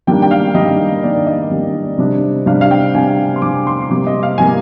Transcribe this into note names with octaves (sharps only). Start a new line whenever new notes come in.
D#3 G3 A#3 D4 G5
G5
F5
D#3 G3 A#3 D4 D#5
D#3 G3 A#3 D4 D5
D#5
D#3 G3 A#3 D4
C3 G3 D4
C3 G3 D4 F5
F5
G5
C3 G3 D4 G#5
C6
C3 G3 D4 D6
C6
C6
C3 G3 A#3 D6
D#5
F5
C3 G3 A#3 G#5